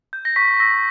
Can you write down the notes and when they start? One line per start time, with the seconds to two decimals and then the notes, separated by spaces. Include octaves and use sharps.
0.13 G6
0.25 A#6
0.36 C#6 B6
0.60 E6 A#6